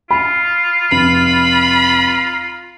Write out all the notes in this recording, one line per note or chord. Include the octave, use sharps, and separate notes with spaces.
F4 B5
F1 B5